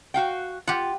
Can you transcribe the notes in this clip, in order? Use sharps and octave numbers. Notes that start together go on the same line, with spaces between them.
F#4 F5 G5
F4 G4 F#5